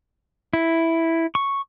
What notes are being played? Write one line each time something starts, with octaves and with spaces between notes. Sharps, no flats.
E4
C#6